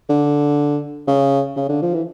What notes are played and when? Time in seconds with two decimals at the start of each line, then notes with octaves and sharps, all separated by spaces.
0.09 D3
1.07 C#3
1.56 C#3
1.69 D3
1.82 F3
1.94 E3